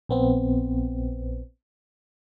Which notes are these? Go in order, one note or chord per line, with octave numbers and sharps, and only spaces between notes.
A#1 B3 C4